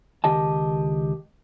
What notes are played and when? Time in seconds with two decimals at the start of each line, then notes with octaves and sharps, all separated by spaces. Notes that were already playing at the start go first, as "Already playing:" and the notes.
0.24 C#2 D#3 G4 D#5 A5